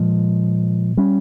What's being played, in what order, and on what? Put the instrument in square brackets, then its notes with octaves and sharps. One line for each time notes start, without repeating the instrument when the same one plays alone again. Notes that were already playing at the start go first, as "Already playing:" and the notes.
Already playing: [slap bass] A#2 F3 G#3
G3 C#4